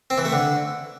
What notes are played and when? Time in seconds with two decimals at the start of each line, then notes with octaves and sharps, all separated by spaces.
0.10 C4
0.18 E3
0.25 A3
0.33 D3